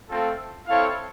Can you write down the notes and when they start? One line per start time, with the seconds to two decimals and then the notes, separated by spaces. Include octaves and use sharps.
0.09 A3 C4 F4 A4
0.66 C4 E4 A4 C#5 F5